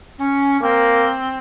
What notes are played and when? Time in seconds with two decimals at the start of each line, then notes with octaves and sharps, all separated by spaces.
0.18 C#4
0.62 A#3 C4